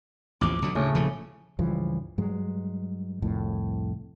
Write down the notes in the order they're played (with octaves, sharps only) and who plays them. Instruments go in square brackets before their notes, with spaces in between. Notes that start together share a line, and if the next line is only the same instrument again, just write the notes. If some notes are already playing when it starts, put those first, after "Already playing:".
[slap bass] A1 D#2 F3 [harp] D6
[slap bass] B1 D3 F#3
[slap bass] D2 [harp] A2 C#3
[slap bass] D#1 F3 A3
[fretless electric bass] C#2 G2 E3 F3
G2 F#3 G#3
C2 F2 A2